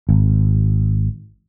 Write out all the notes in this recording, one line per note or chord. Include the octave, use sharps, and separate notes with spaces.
G#1